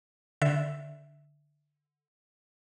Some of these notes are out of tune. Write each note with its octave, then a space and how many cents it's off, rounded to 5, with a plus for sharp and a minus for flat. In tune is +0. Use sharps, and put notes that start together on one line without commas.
D3 +0 E5 +0